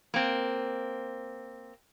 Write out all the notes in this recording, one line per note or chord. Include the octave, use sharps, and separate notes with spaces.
A#3 C4